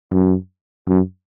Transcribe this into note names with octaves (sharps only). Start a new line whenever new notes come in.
F#2
F#2